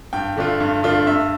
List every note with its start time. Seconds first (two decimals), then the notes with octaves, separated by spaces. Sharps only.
0.13 G2 G5
0.37 D3 A3 D4 F4
0.60 G2
0.83 D3 A3 D4 F4
1.06 G2 E5